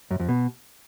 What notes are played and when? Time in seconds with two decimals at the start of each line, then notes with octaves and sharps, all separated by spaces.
0.11 F#2
0.20 F2
0.28 B2